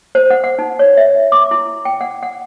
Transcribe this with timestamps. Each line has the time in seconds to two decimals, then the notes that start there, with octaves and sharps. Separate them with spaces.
0.15 C5
0.30 F#5
0.44 F#5
0.59 D#4
0.79 C#5
0.97 E5
1.32 D6
1.51 E4
1.85 G5
2.01 F#5
2.23 F#5